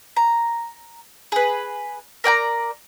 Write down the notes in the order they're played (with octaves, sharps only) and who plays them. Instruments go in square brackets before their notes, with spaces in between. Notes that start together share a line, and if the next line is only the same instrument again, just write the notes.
[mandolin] A#5
G#4 B4
A#4 D5 G5 A#5